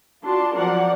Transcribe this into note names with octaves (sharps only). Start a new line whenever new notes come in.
D4 F4 F#4 A5 C6
F3 F#3 C4 A#4 D5 F#5